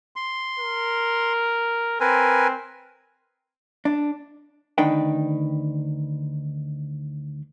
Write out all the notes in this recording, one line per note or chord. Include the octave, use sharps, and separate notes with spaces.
C6
A#4
C4 A#4 B4 G#5
D4
D2 D#3 D4 D#4 B4 G5